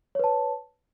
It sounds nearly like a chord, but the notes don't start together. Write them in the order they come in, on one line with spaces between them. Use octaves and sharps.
C#5 B4 A5